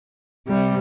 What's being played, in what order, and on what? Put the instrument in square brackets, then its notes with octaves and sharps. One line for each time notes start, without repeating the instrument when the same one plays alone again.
[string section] C3 G3